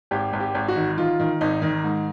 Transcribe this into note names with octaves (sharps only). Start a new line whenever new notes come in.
G#1 G4
G#1
G4
G#1
F#4
D#3
D#3 F4
D#3
G#1 D#4
D#3
G#2